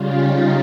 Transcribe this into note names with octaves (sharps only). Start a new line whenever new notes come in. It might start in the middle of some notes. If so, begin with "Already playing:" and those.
Already playing: C#3 G3 C#4 F4
D#4